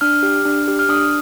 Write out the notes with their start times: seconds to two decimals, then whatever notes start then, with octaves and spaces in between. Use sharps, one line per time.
0.01 D4 F6
0.23 G4
0.45 D4
0.68 G4
0.79 F6
0.89 D4 D#6